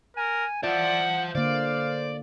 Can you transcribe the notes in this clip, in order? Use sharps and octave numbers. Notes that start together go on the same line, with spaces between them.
A#4 G#5
F4 C5 D5 E5 F#5 A5
D3 A#3 C5 D5 F5